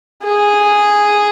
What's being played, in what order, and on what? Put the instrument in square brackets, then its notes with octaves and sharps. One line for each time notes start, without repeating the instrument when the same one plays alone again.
[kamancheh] G#4